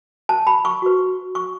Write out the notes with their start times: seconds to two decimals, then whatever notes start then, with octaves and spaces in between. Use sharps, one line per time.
0.29 A5
0.47 B5
0.65 C#6
0.82 F#4 B4
1.35 C#6